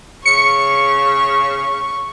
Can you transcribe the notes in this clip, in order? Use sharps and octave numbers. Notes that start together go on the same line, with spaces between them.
C#3 C#6 C#7